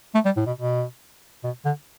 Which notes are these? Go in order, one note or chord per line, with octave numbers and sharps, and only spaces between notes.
A3
G3
A2
B2
B2
B2
D3